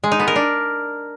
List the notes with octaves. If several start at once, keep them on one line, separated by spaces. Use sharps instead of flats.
G#3
D#4
B3
A#4
D4